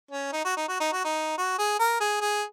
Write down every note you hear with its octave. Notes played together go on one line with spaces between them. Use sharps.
C#4
D#4
F#4
D#4
F#4
D#4
F#4
D#4
F#4
G#4
A#4
G#4
G#4